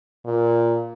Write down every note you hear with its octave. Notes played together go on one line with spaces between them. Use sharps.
A#2